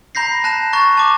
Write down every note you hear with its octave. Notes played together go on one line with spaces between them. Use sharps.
A#5 B5 G6 A#6 C7
A5 F#6 A#6 E7
A#5 C#6 F#6 A6
A5 D6